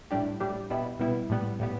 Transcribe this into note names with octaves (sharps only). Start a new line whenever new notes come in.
A2 G3 D4 G4
A2 G3 D4 G4
B2 G3 B3 E4
B2 G3 B3 E4
A2 G3 B3
A2 G3 B3